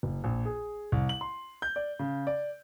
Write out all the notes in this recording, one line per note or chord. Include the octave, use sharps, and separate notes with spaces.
F#1
A#1
G#4
C2
F#7
C6
G6
D5
C#3
D5